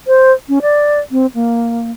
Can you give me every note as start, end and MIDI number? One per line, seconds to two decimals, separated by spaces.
0.07 0.33 72
0.49 0.59 61
0.62 1.00 74
1.11 1.26 60
1.35 1.90 58